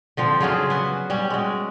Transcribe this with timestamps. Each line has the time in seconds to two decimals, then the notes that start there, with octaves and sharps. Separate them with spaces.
0.17 D3 F3 C4
0.40 C#3 F#3 F4 G#4
0.70 B3 F#4
1.10 G3 C#4
1.30 G#3 F#4